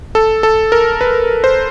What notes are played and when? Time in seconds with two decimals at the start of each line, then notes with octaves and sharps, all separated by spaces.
0.15 A4
0.43 A4
0.72 A#4
1.01 B4
1.44 C5